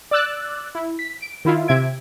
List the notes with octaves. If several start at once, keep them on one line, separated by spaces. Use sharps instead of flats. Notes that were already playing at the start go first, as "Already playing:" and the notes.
D5 D6 E6 F#6 A6
E4
B6
D7
D#3 E4 F4
C3 E5 G#6 D7